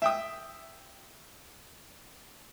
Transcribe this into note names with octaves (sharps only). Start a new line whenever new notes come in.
E5 G5 D#6